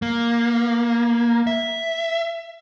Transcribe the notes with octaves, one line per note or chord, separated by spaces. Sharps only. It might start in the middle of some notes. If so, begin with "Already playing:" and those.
A#3
E5